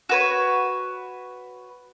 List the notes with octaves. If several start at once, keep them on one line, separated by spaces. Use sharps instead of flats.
F#4 B4 C#5